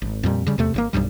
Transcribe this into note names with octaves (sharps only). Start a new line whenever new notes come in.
G#1
F2 A#2 G3
C#3 G3
E2 C3 A3
G#1 C3 A#3
B1 E2 G2 G3